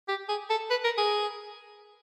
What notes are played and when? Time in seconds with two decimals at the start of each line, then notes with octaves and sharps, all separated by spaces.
0.08 G4
0.29 G#4
0.50 A4
0.70 B4
0.84 A#4
0.98 G#4